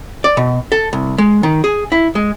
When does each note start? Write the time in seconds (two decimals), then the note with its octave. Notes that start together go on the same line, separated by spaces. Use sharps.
0.24 D5
0.37 B2
0.72 A4
0.93 C2
1.18 G#3
1.43 D#3
1.64 G#4
1.92 E4
2.15 G#3